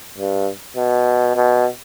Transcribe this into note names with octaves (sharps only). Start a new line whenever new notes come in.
G2
B2
B2